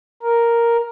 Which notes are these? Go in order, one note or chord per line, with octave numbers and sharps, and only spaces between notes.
A#4